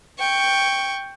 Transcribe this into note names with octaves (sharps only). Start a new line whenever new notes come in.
G5 C#6